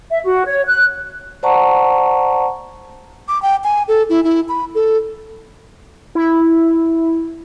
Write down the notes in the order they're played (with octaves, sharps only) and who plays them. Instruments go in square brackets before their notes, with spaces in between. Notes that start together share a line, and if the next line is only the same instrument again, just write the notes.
[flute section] E5
F#4
C#5
F#6
[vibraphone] C5 D5 F#5 A5 A#5 C#6
[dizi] D6
G5
G#5
A4
E4
E4
B5
A4
[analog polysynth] E4